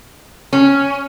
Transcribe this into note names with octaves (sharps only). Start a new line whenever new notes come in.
C#4